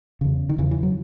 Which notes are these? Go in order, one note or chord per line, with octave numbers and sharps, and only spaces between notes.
E2 C#3
D#3
E2 C#3 E3
E3
F#3